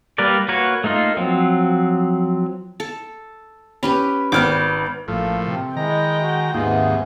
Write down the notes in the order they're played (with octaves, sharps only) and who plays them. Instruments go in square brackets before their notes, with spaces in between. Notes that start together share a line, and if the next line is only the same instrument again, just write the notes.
[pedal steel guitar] G3 A#3 A#4 B4 D5
A#3 F#4 A#4 B4 C#5
A3 A#3 D#4 F4
F3 F#3 C4
[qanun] A4
[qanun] C#4 G4 B4 [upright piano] B5
[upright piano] G#1 F6 [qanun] B3 G5 D6
[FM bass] A1 [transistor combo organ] A2 F3 [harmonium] A#3 A4
[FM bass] C3 [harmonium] C4
[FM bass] D#3 [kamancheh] G#3 G5 [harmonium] E4 D#5 [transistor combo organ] A#5
[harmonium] F#4
[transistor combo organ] D#2 G#2 [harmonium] C3 B3 [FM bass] A#3 [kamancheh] F4 G#4